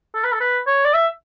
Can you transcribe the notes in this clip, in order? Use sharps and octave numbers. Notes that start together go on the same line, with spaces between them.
A4
B4
A4
B4
C#5
D5
E5